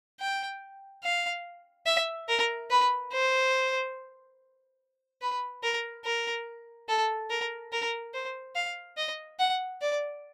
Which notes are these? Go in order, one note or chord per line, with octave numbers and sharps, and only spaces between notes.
G5
F5
E5
A#4
B4
C5
B4
A#4
A#4
A4
A#4
A#4
C5
F5
D#5
F#5
D5